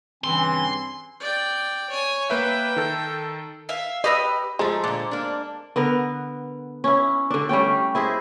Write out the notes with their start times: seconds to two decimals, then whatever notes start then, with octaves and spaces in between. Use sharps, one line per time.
0.24 G2 C#3 E3 C4 G#5 C6
1.20 D5 G5
1.90 C#5 G#5
2.30 A#3 B4 E5 G5
2.76 D#3 A4
3.69 E5 F5
4.04 G4 B4 D#5 E6
4.59 F3 G#3 A3 A4 C5 A#5
4.83 A#2 D3
5.11 A#3 D4
5.76 D3 B3 A#4
6.84 C#4 E4
7.30 D3 D4
7.49 G3 A3 C#4 G5
7.95 E4 G#4 C5 D#5